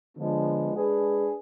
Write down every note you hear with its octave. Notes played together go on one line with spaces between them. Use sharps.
D3 F3 G#3 B3
G#3 D4 G#4 B4